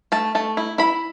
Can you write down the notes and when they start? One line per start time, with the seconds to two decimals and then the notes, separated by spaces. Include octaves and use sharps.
0.12 A3 A5
0.35 A3 A5
0.57 E4
0.78 E4 B5